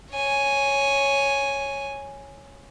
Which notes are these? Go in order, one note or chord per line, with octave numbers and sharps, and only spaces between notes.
C#5 G#5